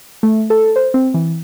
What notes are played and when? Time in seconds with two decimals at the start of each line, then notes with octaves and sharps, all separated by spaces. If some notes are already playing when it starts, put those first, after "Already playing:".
0.23 A3
0.50 A4
0.76 C5
0.94 C4
1.14 E3